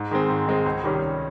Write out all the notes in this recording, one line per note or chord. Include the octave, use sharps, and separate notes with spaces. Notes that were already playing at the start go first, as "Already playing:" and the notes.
Already playing: G#2
D#3 G#3 C4
G#2
D#3 G#3 C4
C#2
C3 D#3 G3 C#4
C#2